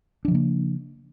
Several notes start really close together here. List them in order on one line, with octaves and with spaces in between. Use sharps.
D4 F3 C#3 A#3